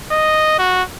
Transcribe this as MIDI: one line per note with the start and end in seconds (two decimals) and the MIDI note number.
0.11 0.55 75
0.59 0.83 66